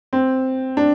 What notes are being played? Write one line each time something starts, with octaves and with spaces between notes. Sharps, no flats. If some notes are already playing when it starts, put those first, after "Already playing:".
C4
D4